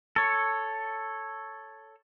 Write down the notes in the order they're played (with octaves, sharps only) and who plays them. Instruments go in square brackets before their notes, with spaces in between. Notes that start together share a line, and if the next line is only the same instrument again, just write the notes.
[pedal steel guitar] A4 C#5